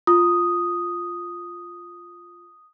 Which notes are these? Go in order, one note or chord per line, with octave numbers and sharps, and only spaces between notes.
F4 D#6